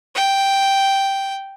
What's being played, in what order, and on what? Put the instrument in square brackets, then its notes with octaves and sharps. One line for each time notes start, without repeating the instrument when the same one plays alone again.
[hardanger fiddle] G5